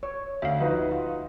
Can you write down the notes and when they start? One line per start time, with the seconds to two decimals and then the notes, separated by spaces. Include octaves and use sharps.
0.03 C#5
0.42 D2 E5 F5
0.60 F3 D#4 F#4 B4
0.91 F4